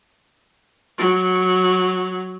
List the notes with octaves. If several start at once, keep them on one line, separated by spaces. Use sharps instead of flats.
F#3